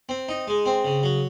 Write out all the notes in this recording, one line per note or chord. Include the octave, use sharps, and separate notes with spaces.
C4
D#4
G#3
C4
C#3
F#3